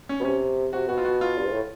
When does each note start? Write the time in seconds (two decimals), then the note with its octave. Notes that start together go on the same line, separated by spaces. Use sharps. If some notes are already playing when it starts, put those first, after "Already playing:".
0.09 C#4
0.20 B2
0.25 C3 C#4
0.73 C3 F#4
0.89 B2 F#4
0.98 F4
1.05 F#4
1.21 F4
1.37 G2
1.45 G#2
1.53 A2